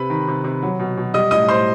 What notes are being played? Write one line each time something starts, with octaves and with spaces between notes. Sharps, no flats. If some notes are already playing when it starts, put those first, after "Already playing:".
Already playing: C3 B4 B5
D#3
C3
C3
F#3
B2
B2
G3 D#5 D#6
A2 D#5 D#6
A2 C5 C6